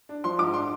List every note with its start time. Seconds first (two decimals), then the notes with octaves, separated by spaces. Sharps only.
0.09 D4
0.24 F3 C6
0.39 G#2 D6
0.54 D4 C6